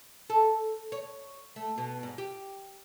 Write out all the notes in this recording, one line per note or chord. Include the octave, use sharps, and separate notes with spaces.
A4
C#5
A3
B2
G#2
G4